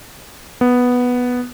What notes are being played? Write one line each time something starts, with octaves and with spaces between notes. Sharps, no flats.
B3